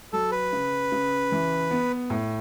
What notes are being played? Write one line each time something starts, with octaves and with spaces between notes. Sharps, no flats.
F#3 A4
B4
C#3
C#3
E3
B3
A2